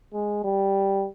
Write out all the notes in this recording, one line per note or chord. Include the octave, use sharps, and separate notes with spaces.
G#3
G3